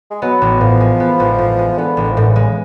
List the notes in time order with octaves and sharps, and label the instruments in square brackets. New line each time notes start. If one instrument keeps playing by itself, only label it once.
[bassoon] G#3
[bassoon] F#3 [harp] B3
[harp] A1
[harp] A2 [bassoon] F3
[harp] G#3
B3
A1
A2
G#3
[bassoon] D3 [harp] B3
[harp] A1
[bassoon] D3
F3
[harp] A2 [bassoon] D3
[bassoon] C#3
[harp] G#3